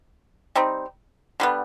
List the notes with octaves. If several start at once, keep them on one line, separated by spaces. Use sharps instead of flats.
G3 C4 D#4
D3 G3 B3